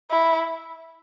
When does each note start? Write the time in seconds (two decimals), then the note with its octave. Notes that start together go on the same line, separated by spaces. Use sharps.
0.11 E4